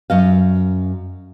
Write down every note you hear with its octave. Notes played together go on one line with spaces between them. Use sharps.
F#2 D#5 F5